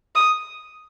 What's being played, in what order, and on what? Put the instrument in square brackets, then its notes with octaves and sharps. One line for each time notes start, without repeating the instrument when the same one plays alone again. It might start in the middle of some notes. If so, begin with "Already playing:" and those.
[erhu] D#6